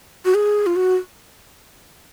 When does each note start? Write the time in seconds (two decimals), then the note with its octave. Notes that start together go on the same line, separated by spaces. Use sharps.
0.25 F#4
0.35 G#4
0.66 F4
0.76 F#4